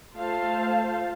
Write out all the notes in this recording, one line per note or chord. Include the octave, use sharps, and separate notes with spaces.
A3 F4 C5 F5 A5